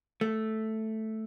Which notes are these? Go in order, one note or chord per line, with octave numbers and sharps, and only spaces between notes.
A3